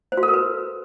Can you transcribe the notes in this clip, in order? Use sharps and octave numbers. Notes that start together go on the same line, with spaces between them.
C5
F#4
A4
A#4
B4